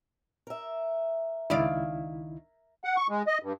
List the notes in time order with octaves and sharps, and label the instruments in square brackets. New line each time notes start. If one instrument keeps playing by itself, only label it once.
[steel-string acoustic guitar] A#4 E5
[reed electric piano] C#2 E4 [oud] D#3 D5 F5
[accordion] F#5
C#6
G#3
D#5
G2